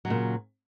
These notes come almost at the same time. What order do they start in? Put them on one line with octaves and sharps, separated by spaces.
F#3 C#3 A#2